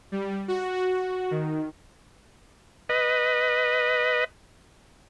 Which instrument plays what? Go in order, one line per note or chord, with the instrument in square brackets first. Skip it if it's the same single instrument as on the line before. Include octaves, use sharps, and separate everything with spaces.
[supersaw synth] G3
F#4
D#3
[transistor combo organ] B4 D#5